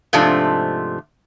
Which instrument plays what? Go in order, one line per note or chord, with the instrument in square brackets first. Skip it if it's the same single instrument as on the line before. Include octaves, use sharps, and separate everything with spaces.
[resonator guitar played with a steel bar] G#2 C3 F3 A3 D4